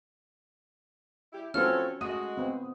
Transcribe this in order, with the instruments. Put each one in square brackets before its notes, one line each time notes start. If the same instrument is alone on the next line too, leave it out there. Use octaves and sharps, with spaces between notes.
[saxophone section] E4 G4
[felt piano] F3 C4 [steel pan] C#4 F#4 B4 [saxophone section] A4 C#5 [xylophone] F6
[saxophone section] G#3 F#4 [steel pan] A3 D#5 [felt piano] D#6
[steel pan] B3 C4